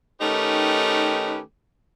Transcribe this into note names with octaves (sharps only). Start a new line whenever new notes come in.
D#3 A3 C#4 D#4 G4 B4